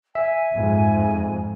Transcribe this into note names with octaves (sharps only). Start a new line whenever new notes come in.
E5 G#5
F2 G#2